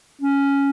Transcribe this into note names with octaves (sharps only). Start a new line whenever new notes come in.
C#4